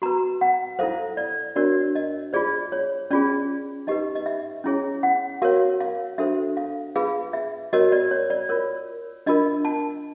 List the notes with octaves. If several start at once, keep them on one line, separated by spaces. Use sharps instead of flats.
F#4 B4 A#5
F#5
E4 A4 C5 F5
D5
D4 F#4 A#4 C#5 D5
D#5
F4 G#4 C5 D5
C#5
C#4 F4 G#4 D5
D#4 G4 B4 D#5
D#5
E5
C#4 E4 G#4 C#5
F#5
F#4 A#4 C#5 F5
F5
D4 F#4 A4 C5 E5
F5
F4 G#4 B4 F5
E5
F#4 A#4 C#5 D#5
D5
C#5
D5
F4 A#4 C#5
D4 F4 A#4 D#5
A5